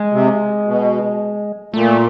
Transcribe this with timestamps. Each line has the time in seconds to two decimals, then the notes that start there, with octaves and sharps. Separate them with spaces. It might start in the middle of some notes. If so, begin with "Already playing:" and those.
Already playing: G#3
0.13 C3
0.67 B2
1.74 A#2 A3